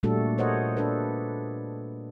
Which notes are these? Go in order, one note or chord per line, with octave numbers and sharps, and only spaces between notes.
A#2 G3 A3 D4 F#4 A4
A#4 C5 C#5 D#5 F#5
D4 A4 B4